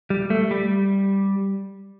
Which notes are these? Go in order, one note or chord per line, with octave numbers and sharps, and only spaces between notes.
G3
A3
G3